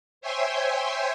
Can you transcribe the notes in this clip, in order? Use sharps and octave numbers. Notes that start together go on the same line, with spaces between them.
C5 C#5 E5 G5 G#5 C6